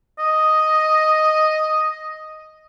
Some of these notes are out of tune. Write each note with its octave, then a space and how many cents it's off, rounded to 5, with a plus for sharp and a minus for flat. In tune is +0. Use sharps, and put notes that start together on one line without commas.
D#5 +0